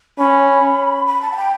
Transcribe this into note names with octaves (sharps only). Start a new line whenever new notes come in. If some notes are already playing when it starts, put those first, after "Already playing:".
C#4 B5
B5
A5
F#5
G5